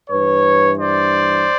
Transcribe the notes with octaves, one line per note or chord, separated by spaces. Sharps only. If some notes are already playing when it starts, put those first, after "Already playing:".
G2 E3 B4 C#5
C5 D5